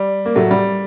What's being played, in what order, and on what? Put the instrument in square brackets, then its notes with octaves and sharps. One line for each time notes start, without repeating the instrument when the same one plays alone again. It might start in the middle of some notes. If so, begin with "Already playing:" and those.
Already playing: [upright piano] G3
A#3
A2 F#3 A3
G3